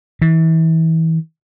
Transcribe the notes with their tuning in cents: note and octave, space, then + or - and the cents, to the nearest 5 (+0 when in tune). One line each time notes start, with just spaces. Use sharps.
E3 -30